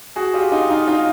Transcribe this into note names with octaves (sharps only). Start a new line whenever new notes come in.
F#4 G#4
F4 G4
D#4 F4
D#4 F4
D#4 F4